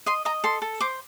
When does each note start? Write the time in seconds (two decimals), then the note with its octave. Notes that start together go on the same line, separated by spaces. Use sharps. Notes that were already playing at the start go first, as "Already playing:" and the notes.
0.06 D#5 C6
0.25 D#5 A#5
0.44 A4 C6
0.62 A4
0.80 C5 D6